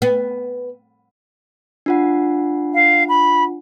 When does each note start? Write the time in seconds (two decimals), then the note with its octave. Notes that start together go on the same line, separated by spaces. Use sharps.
0.02 B3
1.86 D4 F4 F#5
2.74 F5
3.08 B5